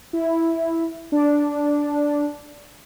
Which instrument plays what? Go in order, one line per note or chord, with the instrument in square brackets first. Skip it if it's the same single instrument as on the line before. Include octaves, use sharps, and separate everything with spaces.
[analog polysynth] E4
D4